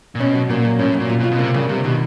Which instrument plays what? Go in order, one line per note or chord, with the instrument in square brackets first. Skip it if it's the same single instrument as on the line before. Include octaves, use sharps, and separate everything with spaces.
[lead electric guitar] A#2
[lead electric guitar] B2 [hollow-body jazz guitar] C#4
[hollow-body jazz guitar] F#3
[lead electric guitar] A#2 [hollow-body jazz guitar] A#3
[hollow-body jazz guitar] F#3
[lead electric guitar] A2 [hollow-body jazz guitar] C#4
[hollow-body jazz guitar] F#3
[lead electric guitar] A#2
[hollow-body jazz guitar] F4
[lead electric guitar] B2
[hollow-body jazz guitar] F4
[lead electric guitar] B2
[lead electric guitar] C3 [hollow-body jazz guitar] A#3
[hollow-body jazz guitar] G2 [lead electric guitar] C#3
[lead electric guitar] C3 [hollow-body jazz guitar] G3
[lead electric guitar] B2 [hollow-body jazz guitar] D#3